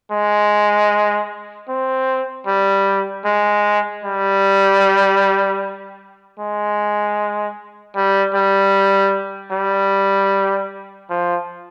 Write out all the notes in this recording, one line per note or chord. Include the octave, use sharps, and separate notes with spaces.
G#3
C4
G3
G#3
G3
G#3
G3
G3
G3
F3